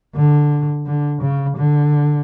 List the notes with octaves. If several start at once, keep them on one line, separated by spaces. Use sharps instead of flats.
D3
D3
C#3
D3